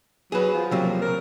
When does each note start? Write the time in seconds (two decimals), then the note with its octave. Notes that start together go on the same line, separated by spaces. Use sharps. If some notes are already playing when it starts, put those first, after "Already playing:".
0.32 F#3 G#4 B4
0.54 F3
0.71 C3 F#3 A#3
1.01 A#4